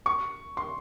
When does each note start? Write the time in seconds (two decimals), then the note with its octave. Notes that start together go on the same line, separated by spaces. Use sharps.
0.06 C#6
0.57 C6